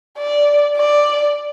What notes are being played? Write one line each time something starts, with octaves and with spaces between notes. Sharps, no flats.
D5
D5